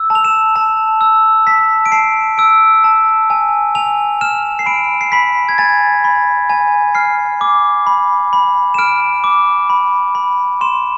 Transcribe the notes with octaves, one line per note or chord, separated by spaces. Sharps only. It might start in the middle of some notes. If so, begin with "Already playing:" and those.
Already playing: E6
A5
F7
E7
A5
E6
A5 B6
D7
A5 C7
E6 D7
A5
G#5
G#5 F7
F6 E7
C7
B5 D7
C7
B5 B6
G#6
G#5 A6
B5
G#5
F6 C7
D6
B5
B5
E7
F6 D7
D6
B5
B5
C6 E7